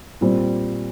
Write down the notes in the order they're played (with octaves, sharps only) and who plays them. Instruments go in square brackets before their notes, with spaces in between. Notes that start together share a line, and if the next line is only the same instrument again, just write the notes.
[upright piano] A#2 G3 C4